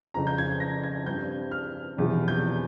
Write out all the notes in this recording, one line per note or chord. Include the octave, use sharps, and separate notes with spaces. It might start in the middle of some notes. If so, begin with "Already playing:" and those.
F2 C#3 F3 C4 A#5
G6
G#6
A#6
G#6
G2 G3 C4 G6
F6
E1 E2 C3 F3
G6